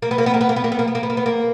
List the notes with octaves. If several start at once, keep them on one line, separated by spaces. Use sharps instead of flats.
A#3
B3
A#3
B3
A#3
B3
A#3
B3
A#3
B3
A#3
B3
A#3
B3
A#3
B3
A#3